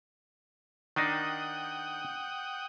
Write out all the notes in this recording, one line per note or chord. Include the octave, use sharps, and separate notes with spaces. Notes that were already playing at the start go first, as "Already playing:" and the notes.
D#3 D4 D#4 F#5 G5 D#6